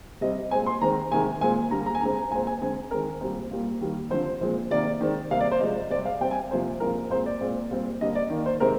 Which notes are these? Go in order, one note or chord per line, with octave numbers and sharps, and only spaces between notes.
C3 G3 C4 D#5
A#2 G#3 C4 G#5
C6
D#3 G#3 C4 A#5
C3 D#3 G#3 G#5
A#2 G#3 C4 G#5
D3 G3 A#3 A#5
A#5
G#5
D3 G#3 C4 A#5
A#2 G#3 C4 G#5
G#5
D3 G#3 C4 G#5
D#3 G#3 C4 A#4
A#2 G3 C4
A#2 G3 A#3
D#3 G3 A#3
D3 F3 C4 C5
A#2 F3 G#3 C4
C3 D#3 A#3 D5
D#3 G#3 C4
C3 G3 A#3 F5
D5
C5
C3 F3 G#3 D#5
C3 G3 C4 D5
F5
C3 G3 C4 G5
G#5
C3 F3 A#3 C5
A#2 F3 G#3 C4 A#4
A#2 G#3 C4 C5
D5
A#2 G#3 C4
A#2 G3 C4
D3 G3 A#3 D#5
D5
D#3 A#3
C5
C3 D#3 G#3 C4 A#4